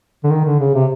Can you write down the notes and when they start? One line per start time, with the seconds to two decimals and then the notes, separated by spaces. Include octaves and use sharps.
0.24 D3
0.31 D#3
0.45 D3
0.60 C#3
0.75 C3